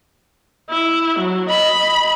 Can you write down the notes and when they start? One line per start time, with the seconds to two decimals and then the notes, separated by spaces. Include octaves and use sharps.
0.70 E4
1.19 F#3
1.49 D#5 B5